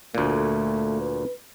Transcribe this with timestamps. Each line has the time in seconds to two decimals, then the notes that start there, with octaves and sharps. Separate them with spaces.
0.15 D2 A#2 A3
1.01 B4